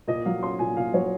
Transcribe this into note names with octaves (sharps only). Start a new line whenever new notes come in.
A#2 D#5
F#3 F5
C#4 C6
A#2 G#5
A#2 F5
F#3 C#5